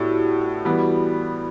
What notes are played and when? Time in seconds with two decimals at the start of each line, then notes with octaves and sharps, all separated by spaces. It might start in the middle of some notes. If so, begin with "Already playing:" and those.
Already playing: A2 B3 D4 E4 F#4 G4 A4
0.17 F#4
0.42 F#4
0.65 E3 G3 B3